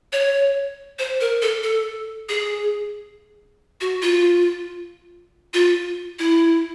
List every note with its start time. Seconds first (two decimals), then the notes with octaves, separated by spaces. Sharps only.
0.13 C#5
0.99 C5
1.21 A#4
1.42 A4
1.63 A4
2.29 G#4
3.81 F#4
4.02 F4
5.54 F4
6.19 E4